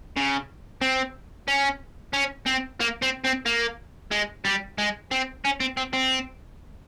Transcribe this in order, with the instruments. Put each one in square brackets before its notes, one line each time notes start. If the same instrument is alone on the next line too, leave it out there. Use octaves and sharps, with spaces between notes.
[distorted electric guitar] C#3
C4
C#4
C#4
C4
A#3
C4
C4
A#3
G#3
G3
G#3
C4
C#4
C4
C4
C4